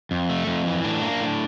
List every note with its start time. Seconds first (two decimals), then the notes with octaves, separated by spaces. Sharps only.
0.11 F2
0.29 A3
0.47 F2
0.66 E3
0.84 A2 D4
1.02 A#3
1.21 A2